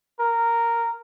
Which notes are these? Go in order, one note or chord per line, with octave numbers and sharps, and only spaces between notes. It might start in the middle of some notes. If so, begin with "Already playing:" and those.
A#4